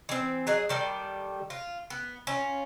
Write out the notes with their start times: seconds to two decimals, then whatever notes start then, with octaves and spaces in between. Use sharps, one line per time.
0.09 E3 C4
0.47 F#3 G#4 D#5
0.69 D#3 G3 A4
1.50 F4
1.90 B3
2.27 C#4 F4